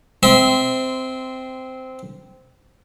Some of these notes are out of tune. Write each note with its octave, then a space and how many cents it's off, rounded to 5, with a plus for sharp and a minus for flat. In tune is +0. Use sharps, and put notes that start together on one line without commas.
C4 -10 E5 -35 C6 -15